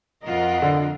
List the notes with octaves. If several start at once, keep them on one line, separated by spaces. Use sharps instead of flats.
F2 F4 A#4 D#5 F#5
D3